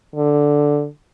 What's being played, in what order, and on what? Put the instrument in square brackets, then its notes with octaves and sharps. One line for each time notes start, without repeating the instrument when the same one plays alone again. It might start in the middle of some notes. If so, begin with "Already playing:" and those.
[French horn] D3